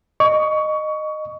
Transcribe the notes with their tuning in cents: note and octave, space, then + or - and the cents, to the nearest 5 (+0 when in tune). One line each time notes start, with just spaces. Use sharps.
D#5 -15 C#6 +20